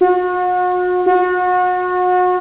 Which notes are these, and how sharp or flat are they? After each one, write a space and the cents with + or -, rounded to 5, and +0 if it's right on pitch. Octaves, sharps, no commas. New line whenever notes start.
F#4 -40
F#4 -35